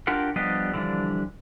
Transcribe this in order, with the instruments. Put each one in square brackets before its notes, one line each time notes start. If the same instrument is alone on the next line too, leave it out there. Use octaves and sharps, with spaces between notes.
[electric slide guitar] D4 F4 G4 A#4 F#5
F3 G3 B3 D4 G4 D#5
D3 E3 F3 G3 D4